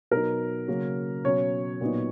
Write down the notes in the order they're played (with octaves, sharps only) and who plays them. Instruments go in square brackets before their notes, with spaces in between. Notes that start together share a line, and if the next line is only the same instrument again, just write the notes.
[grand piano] B2 F#3 B3 D#4 A#4
C#3 F#3 A#3
B2 F#3 C#4 C#5
A#2 F#3 B3 D#4